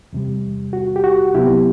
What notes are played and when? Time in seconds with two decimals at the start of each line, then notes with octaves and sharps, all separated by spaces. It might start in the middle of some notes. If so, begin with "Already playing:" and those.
0.13 E2 C3 G3
0.73 F#4
0.96 G4
1.04 F#4
1.34 C2 C3 F#3 B3 E4 G4